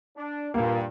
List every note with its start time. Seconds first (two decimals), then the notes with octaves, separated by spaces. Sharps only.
0.17 D4
0.54 G2 A#2 A#3